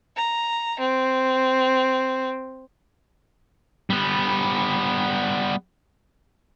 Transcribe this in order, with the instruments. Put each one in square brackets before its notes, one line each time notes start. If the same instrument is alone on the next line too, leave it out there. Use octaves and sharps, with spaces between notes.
[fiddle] A#5
C4
[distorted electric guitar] G3 B3